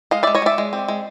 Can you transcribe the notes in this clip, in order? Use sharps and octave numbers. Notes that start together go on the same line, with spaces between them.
G#3 D#5 F5
G#3 D5 E5
C#5 D#5
G#3 D5 E5
G#3
C4
G#3